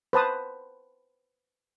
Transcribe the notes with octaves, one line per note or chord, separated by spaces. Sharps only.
B4 C5 A5 D#6